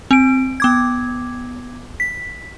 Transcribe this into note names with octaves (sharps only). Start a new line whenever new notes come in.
C4 D7
B3 D6 G#6
B6